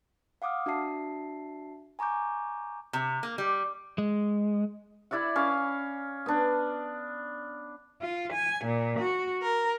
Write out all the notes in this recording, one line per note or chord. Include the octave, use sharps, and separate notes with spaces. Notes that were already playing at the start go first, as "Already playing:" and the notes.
F5 F#5 D6 D#6 F6
D4 F#4 E5 A5 C7
G#5 A#5 C#6 D6 G6
C3
A#3
G3
G#3
E4 D5 E5 F#5
C#4 F5
B3 D4
F4
G#5
A#2
F#4
A#4